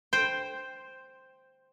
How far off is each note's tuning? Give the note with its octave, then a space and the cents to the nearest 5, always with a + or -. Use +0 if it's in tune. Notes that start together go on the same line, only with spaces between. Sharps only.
C5 +0 G5 +0